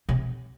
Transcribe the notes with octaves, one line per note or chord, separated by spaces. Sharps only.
C3